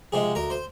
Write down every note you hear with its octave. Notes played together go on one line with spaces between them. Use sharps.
C3 F3 G#3 G#4
D2 A#4
C5